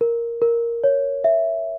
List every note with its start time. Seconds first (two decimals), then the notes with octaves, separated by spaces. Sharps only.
0.01 A#4
0.42 A#4
0.84 C#5
1.24 E5